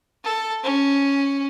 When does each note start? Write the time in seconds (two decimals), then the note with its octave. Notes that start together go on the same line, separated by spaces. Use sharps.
0.24 A4
0.64 C#4